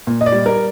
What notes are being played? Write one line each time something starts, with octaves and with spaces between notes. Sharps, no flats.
A#2
D#5
D5
G3
A#4